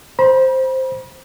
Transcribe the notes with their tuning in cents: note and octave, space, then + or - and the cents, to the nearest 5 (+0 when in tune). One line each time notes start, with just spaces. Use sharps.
C5 +0 B5 -40